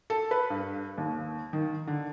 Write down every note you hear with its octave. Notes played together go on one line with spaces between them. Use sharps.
A4
B4
G2
D#2
D#3
D3